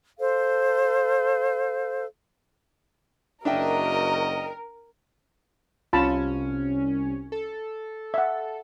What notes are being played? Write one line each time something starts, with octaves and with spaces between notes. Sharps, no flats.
A4 C5 F5
F#1 D4 F#4 A#4 D#5 E5 G5
C2 C#4 F4 A5 B5
A4
E5 F#5